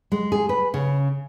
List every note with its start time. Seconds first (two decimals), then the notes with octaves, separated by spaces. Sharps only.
0.12 G#3
0.32 G#4
0.49 B4
0.74 C#3